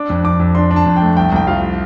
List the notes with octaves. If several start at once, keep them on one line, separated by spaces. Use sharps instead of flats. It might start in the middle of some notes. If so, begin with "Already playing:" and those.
Already playing: D4 D6
F2
D4 D6
F2
D4 C6
D4
A5
F2
A3 G5
C2 G5
C2 G5
F3 F5